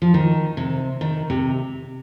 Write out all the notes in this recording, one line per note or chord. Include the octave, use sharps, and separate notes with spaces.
F3
D#3
C3
D#3
C3